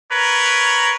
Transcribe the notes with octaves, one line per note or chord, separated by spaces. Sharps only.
A#4 B4 C#5